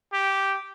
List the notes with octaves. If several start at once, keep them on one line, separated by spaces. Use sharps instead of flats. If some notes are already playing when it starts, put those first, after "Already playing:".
G4